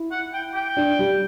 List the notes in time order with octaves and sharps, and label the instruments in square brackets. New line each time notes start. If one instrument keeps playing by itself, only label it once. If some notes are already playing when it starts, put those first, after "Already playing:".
Already playing: [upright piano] E4
[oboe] F#5
G5
G5
[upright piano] D4
G3